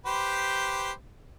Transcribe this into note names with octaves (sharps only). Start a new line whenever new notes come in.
G4 B4 C5